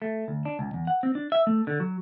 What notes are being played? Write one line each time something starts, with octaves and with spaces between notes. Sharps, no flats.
A3
D2
D4
C#2
E2
F#5
C4
D4
E5
A3
D3
F#3